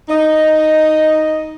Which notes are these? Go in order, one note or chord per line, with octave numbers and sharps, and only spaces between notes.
D#4 D#5